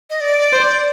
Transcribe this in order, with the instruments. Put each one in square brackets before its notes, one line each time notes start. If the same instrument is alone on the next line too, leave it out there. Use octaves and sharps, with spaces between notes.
[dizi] D#5
D5
[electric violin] C5